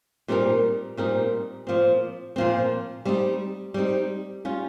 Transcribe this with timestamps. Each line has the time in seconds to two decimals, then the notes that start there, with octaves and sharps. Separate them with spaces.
0.28 A#2 G3 C4 D#4 A#4
0.97 A#2 G3 C4 D#4 A#4
1.67 A#2 F3 C4
2.36 A#2 F3 C4
3.05 G3 C4 D#4
3.74 G3 C4 D#4
4.45 G3 C#4 F4